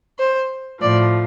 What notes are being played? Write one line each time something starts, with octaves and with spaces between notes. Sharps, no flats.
C5
A2 F3 D5